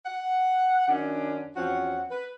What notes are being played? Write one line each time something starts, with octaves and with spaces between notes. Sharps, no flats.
F#5
F#2 D#3 C#4 D4
E2 F3 C4 C#4 F#4 F#5
B4